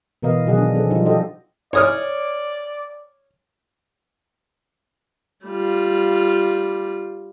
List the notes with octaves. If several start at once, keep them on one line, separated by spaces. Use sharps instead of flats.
B2 E3 B3 A#4 D#5 F5
B2 D#3 F#3 G#4 D#5 F#5
D4
F3 C4 G#4 A4
F3 G3 D4 D#4 F4
D4 F#4 G4 A4 C5 D#5
C#5 D5 D#6 F6
G3 F4